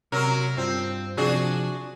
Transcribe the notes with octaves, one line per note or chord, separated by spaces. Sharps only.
C3 F#3 A#4 C6
G2 C4 F4 D5
C3 F3 D4 F#4 G#4